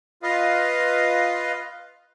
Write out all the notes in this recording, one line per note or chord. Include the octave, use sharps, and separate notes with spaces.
F4 B4 D#5 F5